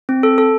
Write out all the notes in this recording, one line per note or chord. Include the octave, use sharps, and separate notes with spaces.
C4
A4
A4